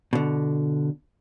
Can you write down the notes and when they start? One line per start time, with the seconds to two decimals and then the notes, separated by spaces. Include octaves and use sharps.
0.13 B2 D3